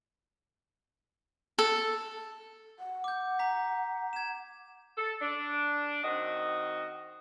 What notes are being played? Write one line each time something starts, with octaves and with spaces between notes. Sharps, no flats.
A4
F#5
D6 G6
A#5 B6
G#6 E7
A4
D4
D#3 C4 F#4 D#5